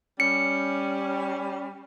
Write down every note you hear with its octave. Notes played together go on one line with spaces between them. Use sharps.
G3 C#4 C#7